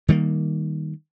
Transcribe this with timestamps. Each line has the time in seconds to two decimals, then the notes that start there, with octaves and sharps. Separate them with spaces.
0.08 D#3 G3 G#3 A#3